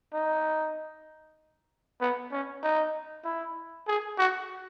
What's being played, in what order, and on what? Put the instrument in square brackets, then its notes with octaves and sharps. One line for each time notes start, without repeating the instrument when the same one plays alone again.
[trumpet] D#4
B3
C#4
D#4
E4
G#4
F#4